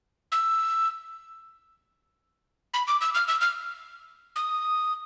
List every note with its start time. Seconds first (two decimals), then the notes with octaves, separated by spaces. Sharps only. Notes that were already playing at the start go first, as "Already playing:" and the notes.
0.32 E6
2.74 B5
2.87 D6
3.01 E6
3.14 F6
3.28 E6
3.41 F6
4.36 D#6